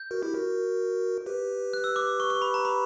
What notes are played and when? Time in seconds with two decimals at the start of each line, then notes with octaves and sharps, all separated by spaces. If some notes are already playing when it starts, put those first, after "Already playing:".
Already playing: G6
0.11 F#4 A#4
0.22 E4 G4
0.34 F#4 A#4
1.26 G4 B4
1.73 F#6
1.84 E6
1.96 D6
2.20 C#6
2.30 C#6
2.42 B5
2.54 A#5
2.65 B5